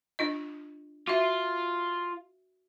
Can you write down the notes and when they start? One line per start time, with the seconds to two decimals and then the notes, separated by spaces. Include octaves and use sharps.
0.19 D4 F4 D#5
1.07 F4 F#4 E5